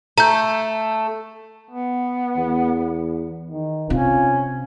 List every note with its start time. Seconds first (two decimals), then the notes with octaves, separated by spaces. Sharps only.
0.18 A3 A#5 G6
1.71 B3
2.37 E2
3.49 D#3
3.90 C3 C#4 F4